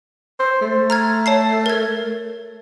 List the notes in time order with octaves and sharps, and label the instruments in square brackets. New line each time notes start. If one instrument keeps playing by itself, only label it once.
[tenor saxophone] C5
A3
[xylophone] A#5 F6 G#6
C#5 A5 C7
A#4 G#6